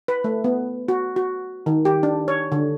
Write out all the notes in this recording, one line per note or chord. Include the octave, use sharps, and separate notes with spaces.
B4
A3
B3
F#4
F#4
D#3
G4
D4
C#5
D3